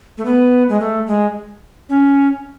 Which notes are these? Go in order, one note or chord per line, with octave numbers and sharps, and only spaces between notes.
A3
B3
G#3
A3
G#3
C#4